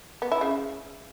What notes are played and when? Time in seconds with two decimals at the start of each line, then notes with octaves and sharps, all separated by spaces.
0.22 B3
0.32 E4
0.41 C#3